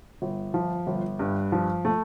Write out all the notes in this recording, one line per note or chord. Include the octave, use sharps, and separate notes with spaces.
G1
F3
G1
G2
F3
A3